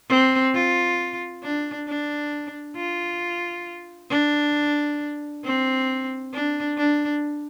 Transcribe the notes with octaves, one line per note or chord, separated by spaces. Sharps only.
C4
F4
D4
D4
F4
D4
C4
D4
D4